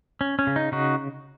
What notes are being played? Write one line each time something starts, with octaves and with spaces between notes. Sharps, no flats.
C#4
C#4
C#3
D#4
C#3 D#4 F#4